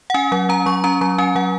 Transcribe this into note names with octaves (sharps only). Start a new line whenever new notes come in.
F#5
C#4 G#5
F#3 F#5
C#4 A#5
F#3 C#6
C#4 A#5
F#3 A#5
C#4 G#5
F#3 F#5